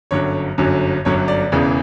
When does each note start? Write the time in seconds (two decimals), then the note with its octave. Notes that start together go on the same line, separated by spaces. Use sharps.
0.11 G1 F#2 D3 F#3 C#5
0.58 G1 F#2 D3 F#3
1.05 G1 F#2 D3 F#3 C#5
1.28 D5
1.52 E1 E2 C#3 E3